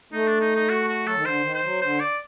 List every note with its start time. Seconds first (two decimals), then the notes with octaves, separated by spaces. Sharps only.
0.13 A3 D#4
0.27 D4
0.41 D#4
0.56 D#4
0.70 F#4
0.88 F#4
1.07 F#3 A4
1.16 D#3
1.25 D3 C5
1.44 D#3
1.54 C5
1.64 F#3
1.82 D3 C5
2.00 D5